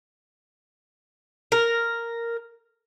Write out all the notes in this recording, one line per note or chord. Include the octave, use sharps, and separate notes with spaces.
A#4